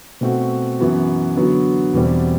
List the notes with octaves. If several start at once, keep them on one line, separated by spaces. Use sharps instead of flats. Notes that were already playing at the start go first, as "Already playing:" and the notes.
B2 A3 C4 F#4
F#2 E3 B3 F#4
D3 F#3 B3 F#4
E2 B2 G3 C4